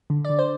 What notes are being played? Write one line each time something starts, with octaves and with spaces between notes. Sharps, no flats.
D3
D5
D3
C5